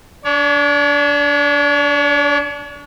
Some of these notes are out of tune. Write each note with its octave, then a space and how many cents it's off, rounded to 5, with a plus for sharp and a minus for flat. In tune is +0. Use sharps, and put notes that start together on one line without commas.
D4 -25 C#5 +30